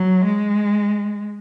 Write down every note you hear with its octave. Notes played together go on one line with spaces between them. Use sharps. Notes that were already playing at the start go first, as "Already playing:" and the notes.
Already playing: F#3
G#3